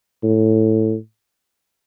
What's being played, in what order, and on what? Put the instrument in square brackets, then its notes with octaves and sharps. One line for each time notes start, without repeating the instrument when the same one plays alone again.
[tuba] A2